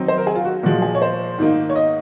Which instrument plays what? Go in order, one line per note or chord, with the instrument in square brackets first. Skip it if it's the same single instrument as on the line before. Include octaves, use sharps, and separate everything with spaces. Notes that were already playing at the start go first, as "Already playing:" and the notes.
Already playing: [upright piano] D#3 F#3 C4 D#4
C5
A#4
G#4
F4
F#4
A#2 F3 G#3 F#4
G#4
C#5
C5
G#2 D#3 A#3 D#4
C#5
D#5